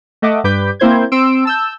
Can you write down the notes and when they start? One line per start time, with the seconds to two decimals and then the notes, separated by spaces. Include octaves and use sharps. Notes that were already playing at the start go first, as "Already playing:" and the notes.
0.22 A3 D#5 E5 F#5 D6
0.44 G2 G3 B4 D6 G6 B6
0.80 A#3 C4 E4 C5 G6 G#6
1.12 C4 C6 E6 D7
1.45 A5 E6 G6